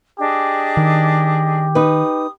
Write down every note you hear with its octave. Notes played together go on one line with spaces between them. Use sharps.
D4 G4 G#4 D#5
D#3
D#4 B4 D#6